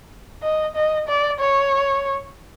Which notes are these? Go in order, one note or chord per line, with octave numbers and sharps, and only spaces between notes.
D#5
D#5
D5
C#5